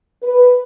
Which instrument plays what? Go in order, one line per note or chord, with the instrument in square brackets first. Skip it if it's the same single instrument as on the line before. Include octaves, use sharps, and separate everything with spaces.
[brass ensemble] B4